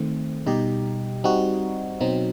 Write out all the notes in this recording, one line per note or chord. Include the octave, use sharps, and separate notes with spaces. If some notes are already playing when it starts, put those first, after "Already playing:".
Already playing: D#3 A3 C4
B2 G3 D#4 G4
G3 C4 D#4 F#4
B2 F#3 C4 D#4